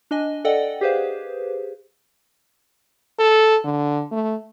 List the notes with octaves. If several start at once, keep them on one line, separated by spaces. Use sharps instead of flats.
D4 D#5 G#5
A4 D5 D#5 F#5 G5
G4 G#4 B4 C5 F5
A4
D3
A3